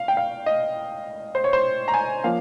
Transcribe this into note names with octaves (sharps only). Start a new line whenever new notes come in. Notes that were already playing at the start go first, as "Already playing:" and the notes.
Already playing: F5
G5
F5
D#5
C5
C#5
C5
A#5
G#5
F3 A#3 C#4 F5